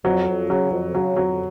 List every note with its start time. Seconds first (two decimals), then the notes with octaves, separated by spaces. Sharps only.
0.05 F2 F#3
0.28 F2
0.50 C#3 F#3
0.72 F2
0.95 C#3 F#3
1.16 F2 F#3